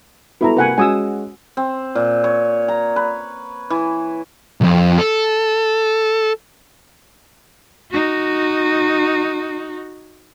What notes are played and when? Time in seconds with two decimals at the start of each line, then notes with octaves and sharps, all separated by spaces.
0.41 B3 E4 F#4 A4 E5 A#5
0.57 C3 A#3 B4 F#5 G#5
0.78 G#3 C#4 F#4 G#5 D#6 E6
1.57 C4
1.95 A#2
2.24 C#5
2.68 A#5
2.96 B4
3.70 E3
4.61 B1 F2
4.98 A4
7.91 D#4 F#4